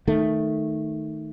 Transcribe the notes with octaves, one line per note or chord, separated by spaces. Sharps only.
D#3 A3